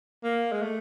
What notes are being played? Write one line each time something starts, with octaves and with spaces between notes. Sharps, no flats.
A#3
G#3
A3